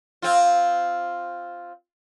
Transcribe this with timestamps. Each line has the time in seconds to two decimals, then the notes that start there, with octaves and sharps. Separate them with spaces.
0.22 C4 F4